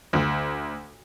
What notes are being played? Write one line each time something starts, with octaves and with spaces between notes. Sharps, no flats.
D2